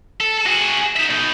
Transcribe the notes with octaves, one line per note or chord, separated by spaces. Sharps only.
A4
F#4 G#4
D#4 E5
B2 D#4